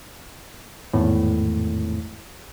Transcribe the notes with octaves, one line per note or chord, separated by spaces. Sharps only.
G#1 E2 A2